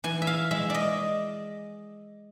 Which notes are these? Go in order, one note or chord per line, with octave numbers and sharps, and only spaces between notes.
E3 G#5
E5
F5
G#3 E5
D5 D#5